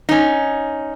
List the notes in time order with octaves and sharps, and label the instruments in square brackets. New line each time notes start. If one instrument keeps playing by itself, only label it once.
[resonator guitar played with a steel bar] C#4 D#4